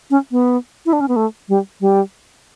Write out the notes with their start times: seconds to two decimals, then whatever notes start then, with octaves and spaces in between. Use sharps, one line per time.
0.11 C#4
0.32 B3
0.86 E4
0.93 D4
1.01 C#4
1.08 B3
1.16 A3
1.49 G3
1.81 G3